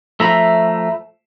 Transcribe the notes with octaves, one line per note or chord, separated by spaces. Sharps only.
F3 A3 E5 A#5 B5